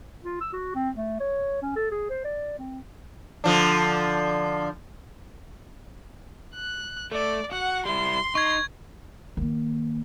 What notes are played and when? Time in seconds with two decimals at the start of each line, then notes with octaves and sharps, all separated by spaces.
0.24 F4
0.41 E6
0.53 F#4
0.75 C4
0.95 A3
1.20 C#5
1.62 C#4
1.76 A4
1.91 G#4
2.10 C5
2.24 D5
2.59 C4
3.44 D3 F3 D4
6.55 F#6
7.12 A3 D5
7.52 F#4 F#5
7.86 G3 E4 C6
8.35 D#4 C#6 G#6
9.37 D#3 A#3